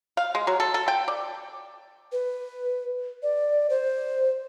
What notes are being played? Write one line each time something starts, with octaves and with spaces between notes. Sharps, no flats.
F5
G#3
F#3
A4
A4
G5
D5
B4
D5
C5